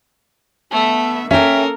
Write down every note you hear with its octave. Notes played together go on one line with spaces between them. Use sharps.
A3 B3 E5
A#3 C#4 A4 A#4 E5 G5